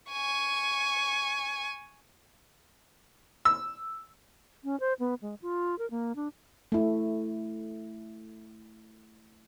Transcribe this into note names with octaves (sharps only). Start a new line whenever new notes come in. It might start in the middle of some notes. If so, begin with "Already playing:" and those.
G#5 C#6
E6
C#4
C5
B3
G#3
F4
A#4
A#3
D4
A3 E4